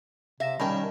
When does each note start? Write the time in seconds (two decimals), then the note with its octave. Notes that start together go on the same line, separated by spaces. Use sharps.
0.40 C3 E5 F5 A#6 E7
0.60 D#3 G3 C#4 A#4 G5 A5 B5